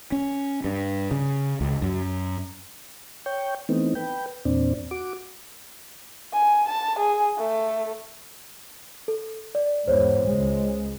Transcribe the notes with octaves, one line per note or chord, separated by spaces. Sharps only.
C#4
G2
C#3
C#2
F#2
C#5 G5
E3 A3 B3 C4 D#4
B4 G5
E2 A#2 C4 D4
F#4 D6
G#5
A5
G#4
A3
A4
D5
E2 G#2 C5 C#5
C#2 G#3